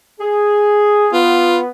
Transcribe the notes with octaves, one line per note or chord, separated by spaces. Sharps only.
G#4
B3 F4